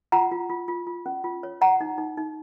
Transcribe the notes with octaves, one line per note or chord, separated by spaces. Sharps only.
F4 F#5 A#5
F4
F4
F4
F4
C#4
F4
C#5
C#5 F#5 A#5
D#4
D#4
D#4